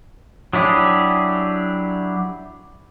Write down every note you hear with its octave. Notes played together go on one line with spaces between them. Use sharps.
F#3 D4 E4 G4 G#4